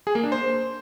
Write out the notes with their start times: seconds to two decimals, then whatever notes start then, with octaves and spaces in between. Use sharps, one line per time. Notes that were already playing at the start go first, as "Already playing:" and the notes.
0.07 G#4
0.15 A#3
0.24 D4
0.32 C5